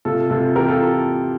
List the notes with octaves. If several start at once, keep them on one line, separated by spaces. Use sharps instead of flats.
C3 F4 A4
C3 F4 A4
E3 G4 A#4
F4 A4